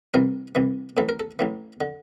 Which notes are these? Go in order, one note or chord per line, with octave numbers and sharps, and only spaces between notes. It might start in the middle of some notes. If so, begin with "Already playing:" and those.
C2 C3 E3 A#4
C2 C3 E3
A1 A2 E3 A4
A#4
A4
A1 A2 E3
D3